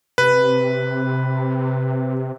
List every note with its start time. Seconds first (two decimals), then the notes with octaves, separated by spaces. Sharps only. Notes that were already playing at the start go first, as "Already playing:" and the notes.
0.18 C3 B4